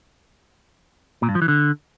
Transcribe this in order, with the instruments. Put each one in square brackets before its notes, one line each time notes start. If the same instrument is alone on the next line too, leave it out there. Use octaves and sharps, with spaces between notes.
[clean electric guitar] A#2
G2
F3
E3
D3